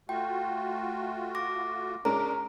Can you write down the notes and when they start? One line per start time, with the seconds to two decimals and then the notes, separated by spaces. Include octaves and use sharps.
0.09 A3 F4 F#4 G5
1.35 D6 A#6
2.05 G#3 C#4 D4 A#4 A#5 D6